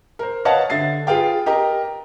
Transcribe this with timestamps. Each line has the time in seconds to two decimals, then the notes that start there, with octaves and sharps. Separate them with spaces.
0.19 A#4 C5
0.45 B4 C#5 D#5 F5 F#5 A5
0.70 D3 E5 A6 C7
1.07 F4 G#4 B4 F5 G5
1.46 G4 A#4 D#5 A#5